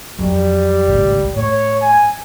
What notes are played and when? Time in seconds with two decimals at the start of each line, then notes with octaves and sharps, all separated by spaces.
0.19 F2 F#3 G3
0.88 G#1 C#2 A2
1.36 A2 C#5
1.82 G#5